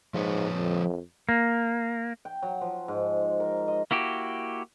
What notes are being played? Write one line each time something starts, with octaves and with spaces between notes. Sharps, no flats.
G#2 F3 B4 C#5
F2
A#3
G5
F#3
F3
G#2
A#4
D#5
A#3 E4 F#4 G4